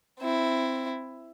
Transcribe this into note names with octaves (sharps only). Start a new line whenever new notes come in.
C4 E4